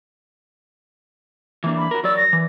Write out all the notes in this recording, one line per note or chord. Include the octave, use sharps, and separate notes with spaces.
E3 A#3 D4
B5
F#4 A#4
F#3 D5 E6
A#6
E3